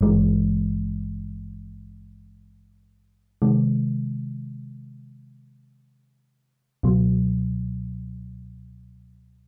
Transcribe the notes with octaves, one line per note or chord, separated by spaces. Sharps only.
G#1 G2 E3 G#3
C3 D#3 G#3
C#2 B2 F#3